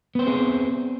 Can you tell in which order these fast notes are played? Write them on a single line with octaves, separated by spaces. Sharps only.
B3 C5 C4 G#4